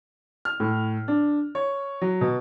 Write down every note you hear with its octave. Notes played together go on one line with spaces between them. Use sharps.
F6
A2
D4
C#5
F#3
B2